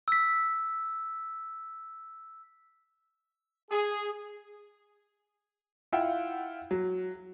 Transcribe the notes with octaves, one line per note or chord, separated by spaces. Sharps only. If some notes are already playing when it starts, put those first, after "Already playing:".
E6 B6
G#4
E4 F4 E5 F#5 G5
F#3